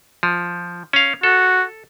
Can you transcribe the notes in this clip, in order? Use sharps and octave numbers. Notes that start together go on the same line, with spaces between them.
F3
C#4 F5
F#4 A4